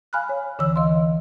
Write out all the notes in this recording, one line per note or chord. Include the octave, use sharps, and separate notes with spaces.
F5 G#5 B5 F6 F#6
C#5
D2 D3 E3 C#5 E6
D#5 F5 C6